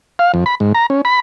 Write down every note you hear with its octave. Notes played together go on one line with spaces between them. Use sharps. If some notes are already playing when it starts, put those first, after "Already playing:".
F5
F2
B5
G#2
A#5
C#4
B5